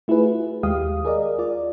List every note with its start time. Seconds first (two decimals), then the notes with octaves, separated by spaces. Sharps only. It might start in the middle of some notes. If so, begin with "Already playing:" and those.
0.08 A3 E4 F4 G#4 B4
0.24 F#4
0.63 D#2 G#3 G4 F5 D#6
1.05 G#4 A#4 D5 D#5
1.39 F4 D5